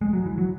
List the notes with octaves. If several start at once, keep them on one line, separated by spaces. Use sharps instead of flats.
G#3
F#3
E3
F#3